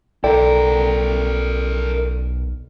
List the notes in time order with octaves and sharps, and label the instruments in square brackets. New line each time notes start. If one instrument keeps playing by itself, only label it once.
[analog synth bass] B1 [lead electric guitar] E4 A#4 [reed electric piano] A4 D5 G5